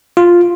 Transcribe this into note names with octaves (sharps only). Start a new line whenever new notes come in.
F4